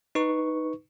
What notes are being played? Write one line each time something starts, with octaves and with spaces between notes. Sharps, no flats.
D#4 B4 C#6